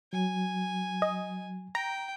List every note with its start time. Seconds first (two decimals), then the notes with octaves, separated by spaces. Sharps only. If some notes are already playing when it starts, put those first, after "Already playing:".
0.13 F#3 G#5
1.02 D#5
1.75 G5 A#5